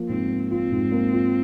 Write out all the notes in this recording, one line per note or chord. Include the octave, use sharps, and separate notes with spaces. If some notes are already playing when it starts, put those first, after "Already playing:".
Already playing: F3 A#3
G#2 C4
A#3
C4 F4
G#2
A#3
F4